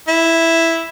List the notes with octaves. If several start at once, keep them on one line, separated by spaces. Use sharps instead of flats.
E4